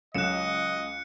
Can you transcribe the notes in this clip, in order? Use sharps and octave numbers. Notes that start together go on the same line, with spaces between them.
C#2 F#3 D#5 F#6 C#7 E7